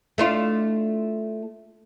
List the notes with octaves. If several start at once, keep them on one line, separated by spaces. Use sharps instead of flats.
A3 D4 F4